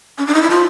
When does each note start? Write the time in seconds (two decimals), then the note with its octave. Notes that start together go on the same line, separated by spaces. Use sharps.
0.18 C#4
0.27 D4
0.35 D#4
0.42 E4
0.50 F4